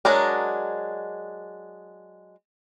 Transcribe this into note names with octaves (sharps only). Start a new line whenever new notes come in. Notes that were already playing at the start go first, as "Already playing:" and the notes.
F#3 G#3 D4 A#4